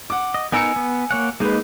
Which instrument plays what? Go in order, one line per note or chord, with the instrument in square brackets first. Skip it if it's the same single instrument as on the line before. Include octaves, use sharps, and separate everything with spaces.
[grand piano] F#5 D6
[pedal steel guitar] D#5
[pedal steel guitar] B3 D#4 A#4 [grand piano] G#5 E6 C#7
[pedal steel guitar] B3
A#3 C#5 F#5
[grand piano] G#3 B4 [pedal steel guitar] A#3 D#4